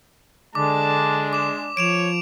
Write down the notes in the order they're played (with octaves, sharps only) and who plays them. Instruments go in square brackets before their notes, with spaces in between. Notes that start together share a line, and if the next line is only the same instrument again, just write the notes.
[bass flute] D3 [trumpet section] G#3 D4 [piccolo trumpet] A5 [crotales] D6
[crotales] D6 E7
[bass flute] F3 [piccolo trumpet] C#5 [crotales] D7 E7 F7